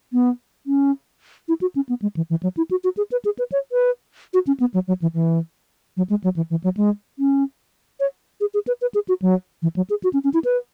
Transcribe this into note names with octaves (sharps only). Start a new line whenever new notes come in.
B3
C#4
E4
F#4
C#4
B3
G#3
E3
E3
F#3
E4
F#4
F#4
G#4
B4
G#4
B4
C#5
B4
F#4
C#4
B3
F#3
F#3
E3
E3
F#3
G#3
F#3
E3
E3
F#3
G#3
C#4
C#5
G#4
G#4
B4
B4
G#4
F#4
F#3
E3
F#3
G#4
F#4
C#4
C#4
E4
B4